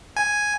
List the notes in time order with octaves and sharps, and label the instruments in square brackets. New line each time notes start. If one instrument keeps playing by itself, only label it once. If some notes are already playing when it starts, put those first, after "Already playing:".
[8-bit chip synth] G#5